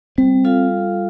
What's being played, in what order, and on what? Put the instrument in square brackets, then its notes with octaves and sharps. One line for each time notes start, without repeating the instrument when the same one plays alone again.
[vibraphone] G3 [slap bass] C4
[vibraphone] F4 A4 F5